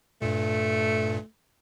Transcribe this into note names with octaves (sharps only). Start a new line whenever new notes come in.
G2 A#2 A3